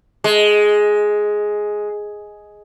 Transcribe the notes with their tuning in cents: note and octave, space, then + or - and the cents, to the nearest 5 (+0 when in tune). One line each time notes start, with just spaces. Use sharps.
G#3 +5